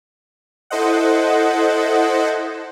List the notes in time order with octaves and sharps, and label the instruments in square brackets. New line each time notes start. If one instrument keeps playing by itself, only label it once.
[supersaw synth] E4 A4 C5 D#5 F#5